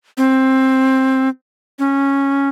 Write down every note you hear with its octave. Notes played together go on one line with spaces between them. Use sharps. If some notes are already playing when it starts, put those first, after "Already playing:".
C4
C#4